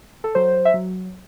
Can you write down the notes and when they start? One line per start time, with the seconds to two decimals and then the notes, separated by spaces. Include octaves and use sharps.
0.24 A4
0.35 F#3 C5
0.65 E5
0.74 F#3